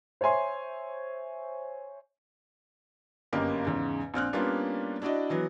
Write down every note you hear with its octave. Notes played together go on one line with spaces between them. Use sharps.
C5 C#5 E5 G#5 C6
G1 F#2 A#3 G4 A#4 D#5
E2 G#2 C#3
A#1 C4 F6 F#6
G3 A#3 B3 C#4 D4 F4
D4 E4 F#4 D5 D#5
E3 F#3 B3